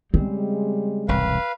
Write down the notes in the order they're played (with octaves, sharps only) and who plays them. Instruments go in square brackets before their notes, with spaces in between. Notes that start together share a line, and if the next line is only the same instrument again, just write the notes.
[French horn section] C#3 G3 G#3 [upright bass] C4
[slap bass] E1 C2 G#2 [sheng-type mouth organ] B4 F5